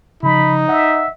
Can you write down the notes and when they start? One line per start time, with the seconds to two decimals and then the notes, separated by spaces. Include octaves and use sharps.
0.23 C#3 F3 D#4 B5
0.68 D#5 E5 F#5